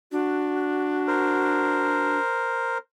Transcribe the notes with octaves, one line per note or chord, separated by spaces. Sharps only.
D4 F#4
A#4 C5